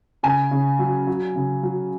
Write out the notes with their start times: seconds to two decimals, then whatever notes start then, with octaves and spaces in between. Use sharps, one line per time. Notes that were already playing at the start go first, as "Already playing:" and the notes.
0.23 C#3 G#5
0.51 C#3
0.79 F#3
1.07 F#3
1.36 C#3
1.63 F#3